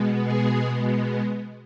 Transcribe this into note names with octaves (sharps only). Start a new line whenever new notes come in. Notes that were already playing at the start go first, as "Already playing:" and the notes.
Already playing: B2 G#3 B3
G#4